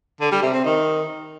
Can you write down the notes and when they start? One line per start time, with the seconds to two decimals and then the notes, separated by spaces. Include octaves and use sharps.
0.20 D3
0.31 G3
0.42 C3
0.53 C4
0.64 D#3